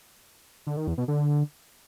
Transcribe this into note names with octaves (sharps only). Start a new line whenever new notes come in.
D3
D#3
E2
B2
D3